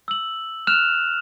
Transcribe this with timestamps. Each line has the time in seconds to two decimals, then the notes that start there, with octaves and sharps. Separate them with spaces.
0.08 E6 F#7
0.67 F6 F#6 E7 F7